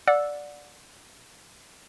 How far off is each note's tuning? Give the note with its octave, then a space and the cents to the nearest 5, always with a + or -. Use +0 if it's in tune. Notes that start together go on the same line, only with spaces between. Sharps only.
D5 +0 F#5 -25 E6 +0